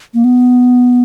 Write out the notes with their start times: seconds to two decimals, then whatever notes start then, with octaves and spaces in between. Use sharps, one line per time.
0.14 A#3
0.24 B3